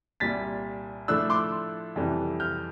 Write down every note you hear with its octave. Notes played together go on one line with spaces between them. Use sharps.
C2 A#2 G3 A6 B6
A2 F3 A3 D4 E6 F#6
C6 D6
F2 C3 E3 G3
F6 G6